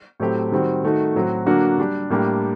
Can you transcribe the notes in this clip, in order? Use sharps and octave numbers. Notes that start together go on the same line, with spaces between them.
A2 F#3 A3 C4 G4
D#3 G3 C4 F#4
D#3 A3 D#4 F#4
A2 F#3 C4 F#4
D3 F#3 A#3 D4 F#4
G3 D4 G4
A2 G3 A#3 D4 G4